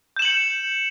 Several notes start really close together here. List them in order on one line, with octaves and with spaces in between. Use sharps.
G6 E7 F#7 C#7